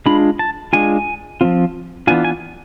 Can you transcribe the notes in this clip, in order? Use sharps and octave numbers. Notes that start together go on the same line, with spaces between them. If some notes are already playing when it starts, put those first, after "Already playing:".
G#3 D4 F4 B5
A5
G#3 D4 F4 G#5
F3 A3 C4 F4
E3 B3 D4 F4 G#5
G#5